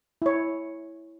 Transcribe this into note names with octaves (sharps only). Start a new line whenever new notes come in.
E4 C#5